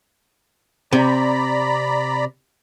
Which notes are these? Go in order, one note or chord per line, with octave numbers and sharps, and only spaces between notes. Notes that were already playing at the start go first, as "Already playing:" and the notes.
C3 D5 A#5 B5